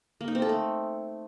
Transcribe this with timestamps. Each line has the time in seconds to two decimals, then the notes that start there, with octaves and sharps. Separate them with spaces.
0.21 A#3
0.28 D#4
0.35 C4
0.42 A4
0.49 A3